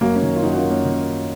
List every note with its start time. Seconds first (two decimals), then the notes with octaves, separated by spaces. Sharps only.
0.01 F#2 F#3 A#3
0.15 A#3 C#4
0.22 D#3
0.36 F4
0.43 F#2 D#4 F#4
0.53 F#4
0.56 C#4 F4
0.64 F#2
0.70 A#3 C#4
0.85 D#3
1.05 F#2